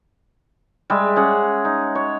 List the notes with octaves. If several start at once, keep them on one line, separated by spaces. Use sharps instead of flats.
G3 G#3 E5
C#4 G#4 F#5
D#4
C#5